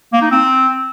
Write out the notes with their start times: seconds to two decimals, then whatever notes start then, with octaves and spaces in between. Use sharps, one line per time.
0.13 A#3
0.22 D#4
0.31 C4